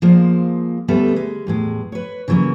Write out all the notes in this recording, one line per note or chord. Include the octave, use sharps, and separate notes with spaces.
F3 G#3 A#3 C5
D2 G3 B3 A4 E5
G#3
E2 A2 G#3
B4 C#5
C#3 E3 F#3 A#3 A#4